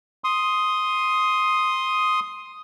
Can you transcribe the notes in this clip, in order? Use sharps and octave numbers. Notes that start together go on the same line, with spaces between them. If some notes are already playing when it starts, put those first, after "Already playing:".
C6 D#6